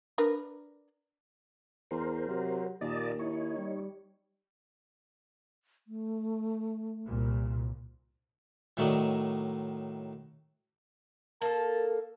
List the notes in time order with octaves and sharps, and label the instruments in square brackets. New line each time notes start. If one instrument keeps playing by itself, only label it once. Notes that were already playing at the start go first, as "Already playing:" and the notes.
[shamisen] D4 A#4 B4
[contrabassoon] E2 [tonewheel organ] A#4 C5
[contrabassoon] C3 [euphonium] F#3
[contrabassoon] D#2 [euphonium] A#2 [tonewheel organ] D5 D#5 A5
[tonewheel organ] D#4 C#5 [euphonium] E4
[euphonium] G3
[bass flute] A3
[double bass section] C2 A#2
[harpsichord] A2 D#3 F#3 A3 D5 D#5
[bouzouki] A#3 A4 [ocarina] A#4 [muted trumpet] A5